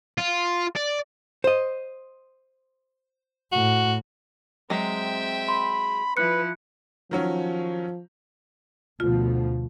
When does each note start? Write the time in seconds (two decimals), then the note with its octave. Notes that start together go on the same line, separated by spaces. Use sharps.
0.18 F4
0.76 D5
1.44 C5 D#5
3.52 A2 F#4
4.70 F#3 G#3 C4 E5 G5
5.49 B5 C6
6.17 F3 E4 B4 F#6 C#7
7.11 D#3 F3 F#3 C#4
9.00 D2 B2 F3 F4